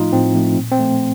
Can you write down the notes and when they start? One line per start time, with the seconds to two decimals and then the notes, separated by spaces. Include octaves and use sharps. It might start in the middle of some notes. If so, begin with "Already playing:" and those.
Already playing: A2 F3 A3 D#4 F4
0.13 A2 C4
0.34 F3 A3
0.57 A#2
0.72 C4
0.79 F3 A3